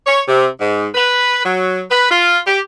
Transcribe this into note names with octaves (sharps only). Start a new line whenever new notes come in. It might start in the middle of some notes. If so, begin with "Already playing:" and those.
C#5
C3
G#2
B4
F#3
B4
F4
G4